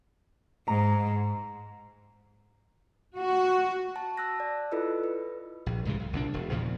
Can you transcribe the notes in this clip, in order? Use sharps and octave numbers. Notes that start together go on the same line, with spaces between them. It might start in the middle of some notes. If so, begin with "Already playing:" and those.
G#2 A#5
F#4
A5
A5 E6 F#6 A#6
D5
E4 F4 A4 B4 D#5 E6
B4
A#1
C2 G#2 C#3 E3
B1
C2 A#2 D4
E1
E2 A#2 C#3 F3